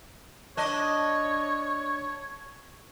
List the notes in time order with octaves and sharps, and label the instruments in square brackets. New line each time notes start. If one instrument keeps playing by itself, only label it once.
[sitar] D4 D#5 [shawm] C#5